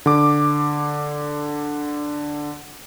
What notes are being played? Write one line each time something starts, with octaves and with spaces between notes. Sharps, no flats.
D3 D6